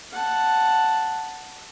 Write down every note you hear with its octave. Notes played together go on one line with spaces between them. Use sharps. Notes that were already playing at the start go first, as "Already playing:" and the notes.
F#5 A5